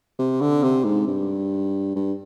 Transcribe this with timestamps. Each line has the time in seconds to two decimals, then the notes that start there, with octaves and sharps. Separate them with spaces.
0.19 C3
0.41 D3
0.63 C3
0.85 G#2
1.07 G2
1.96 G2